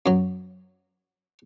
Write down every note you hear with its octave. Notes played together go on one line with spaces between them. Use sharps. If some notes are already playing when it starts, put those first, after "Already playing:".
F#2 F#3